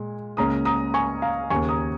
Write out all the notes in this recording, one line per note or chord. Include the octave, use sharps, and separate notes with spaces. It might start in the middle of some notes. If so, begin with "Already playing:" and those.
Already playing: A#2 G#3
C#2 C#3 A#3 C#4 A#5 D#6
A#5 D#6
G#5 C#6
F5 A#5
D#2 C#3 A#3 G#5 C#6
A#5 D#6